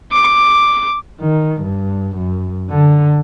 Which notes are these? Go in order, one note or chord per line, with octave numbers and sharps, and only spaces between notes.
D6
D#3
G2
F#2
D3